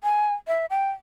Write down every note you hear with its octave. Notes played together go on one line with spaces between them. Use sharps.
G#5
E5
G5